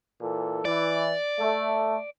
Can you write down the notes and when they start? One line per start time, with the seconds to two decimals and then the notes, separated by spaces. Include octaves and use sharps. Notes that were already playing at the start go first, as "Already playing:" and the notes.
0.20 A#2 E3 A4
0.65 E3 D5
1.38 A3